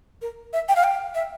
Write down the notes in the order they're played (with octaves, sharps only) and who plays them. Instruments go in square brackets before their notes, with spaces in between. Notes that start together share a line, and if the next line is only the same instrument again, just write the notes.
[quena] A#4
E5
G5
F5
G5
E5